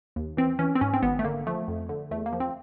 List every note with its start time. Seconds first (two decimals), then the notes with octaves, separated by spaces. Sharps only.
0.16 D#2
0.37 E3 C4
0.59 E3 C#4
0.75 C4
0.81 G#2 C#4
0.94 C4
1.02 G#1 B3
1.19 A3
1.25 D3 A#3
1.47 F3 A3
1.68 F2
1.89 D3
2.11 E2 A3
2.26 A#3
2.33 F3
2.40 C4